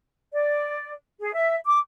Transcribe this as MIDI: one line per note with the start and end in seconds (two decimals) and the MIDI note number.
0.34 0.92 74
1.21 1.34 68
1.34 1.58 76
1.67 1.79 86